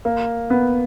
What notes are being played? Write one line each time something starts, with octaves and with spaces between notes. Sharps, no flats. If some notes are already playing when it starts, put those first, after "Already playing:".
A#3
B3